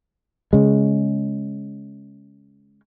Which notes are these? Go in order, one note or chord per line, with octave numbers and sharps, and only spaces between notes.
C#3 G#3